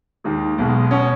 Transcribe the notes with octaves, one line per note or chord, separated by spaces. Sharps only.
D#2 D#3 G#3
B1 B2 G#3
B2 C#4